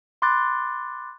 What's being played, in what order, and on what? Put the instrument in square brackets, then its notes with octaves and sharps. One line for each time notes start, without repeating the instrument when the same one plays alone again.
[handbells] B5 C6 D6 F#6 A6